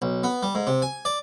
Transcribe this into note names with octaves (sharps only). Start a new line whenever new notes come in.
B1
B3
G3
G#2
C3
G#5
D5